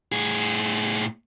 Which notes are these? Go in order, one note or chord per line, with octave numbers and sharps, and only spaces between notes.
A2 G#4